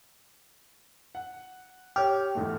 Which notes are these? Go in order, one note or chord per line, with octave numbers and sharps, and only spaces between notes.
F#5
G4 C#5 F6
E2 G#2 A3